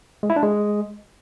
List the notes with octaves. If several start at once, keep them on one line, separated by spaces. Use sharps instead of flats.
G#3
E4
D4
G#3